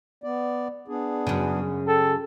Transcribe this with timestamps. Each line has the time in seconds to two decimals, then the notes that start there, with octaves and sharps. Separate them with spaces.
0.24 B3 D5
0.88 B3 D4 G#4
1.27 F#2 C#3
1.88 A4 G5